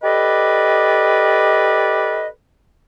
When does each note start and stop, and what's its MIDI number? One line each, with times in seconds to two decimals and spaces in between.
0.03 2.28 67
0.03 2.28 69
0.03 2.28 71
0.03 2.28 74
0.03 2.28 75